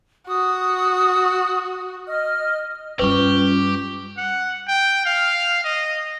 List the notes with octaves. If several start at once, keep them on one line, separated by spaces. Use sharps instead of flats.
F#4 D#6
D#5 F6
G2 G3 C#4 F4 G4 B4 C#6
F#5
G5
F5
D#5